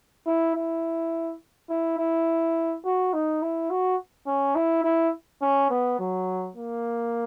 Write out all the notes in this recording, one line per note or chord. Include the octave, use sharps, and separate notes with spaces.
E4
E4
E4
E4
F#4
D#4
E4
F#4
C#4
E4
E4
C#4
B3
F#3
A#3